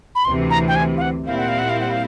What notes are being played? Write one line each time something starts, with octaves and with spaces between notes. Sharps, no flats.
B5
D2 C3 E3 C6
A#5
G5
G#5
F5
F#5
A#2 G3 C4 E4 F5
F#5
F5
F#5
F5
F#5
F5